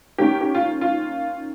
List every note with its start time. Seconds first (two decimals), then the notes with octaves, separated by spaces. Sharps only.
0.18 D#3 A#3 C#4 G4
0.41 G4
0.55 F4
0.81 F4